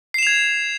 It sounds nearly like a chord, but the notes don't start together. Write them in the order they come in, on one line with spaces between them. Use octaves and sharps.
C7 E7 F7 G#6